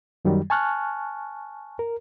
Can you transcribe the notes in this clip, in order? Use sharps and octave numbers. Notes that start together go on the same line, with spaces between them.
F#2 D#3 F#3 G3
G#5 A5 C#6 F6 F#6
A#4